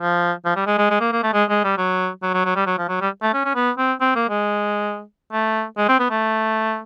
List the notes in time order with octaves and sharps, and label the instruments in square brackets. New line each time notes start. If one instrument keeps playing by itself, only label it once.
[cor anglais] F3
F3
G3
G#3
G#3
G#3
A#3
A#3
A3
G#3
G#3
G3
F#3
F#3
F#3
F#3
G3
F#3
F3
F#3
G3
A3
C#4
C#4
B3
C4
C4
A#3
G#3
A3
G#3
C4
B3
A3